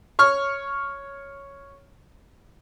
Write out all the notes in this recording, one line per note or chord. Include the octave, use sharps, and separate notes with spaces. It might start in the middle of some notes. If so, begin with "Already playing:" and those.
C#5 C#6 F6